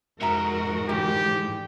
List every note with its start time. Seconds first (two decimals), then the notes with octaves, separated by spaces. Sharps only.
0.21 F2 G#2 C3 F#4 A#4 E5 A#5
0.89 D3 E3 G3 G4